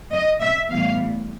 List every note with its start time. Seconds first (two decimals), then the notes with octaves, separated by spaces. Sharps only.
0.12 D#5
0.41 E5
0.70 A2 E3 G3 B3 F5